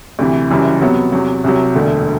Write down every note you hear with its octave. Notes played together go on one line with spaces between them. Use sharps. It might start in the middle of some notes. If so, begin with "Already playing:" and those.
D2 C3 E3
F#1 F#2 E3 G3
C3 F#3 B3
E2 C3 F#3
C2 C3 F#3
E1 D2 D3 A3